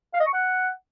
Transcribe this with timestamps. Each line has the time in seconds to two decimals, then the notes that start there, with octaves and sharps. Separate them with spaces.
0.14 F5
0.20 D#5
0.27 C#6
0.33 F#5